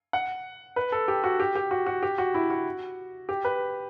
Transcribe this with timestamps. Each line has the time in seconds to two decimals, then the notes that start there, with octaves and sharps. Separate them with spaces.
0.13 F#5
0.76 B4
0.92 A4
1.08 G4
1.24 F#4
1.40 G4
1.55 G4
1.71 F#4
1.86 F#4
2.03 G4
2.18 F#4
2.34 E4
2.50 F#4
3.29 G4
3.45 B4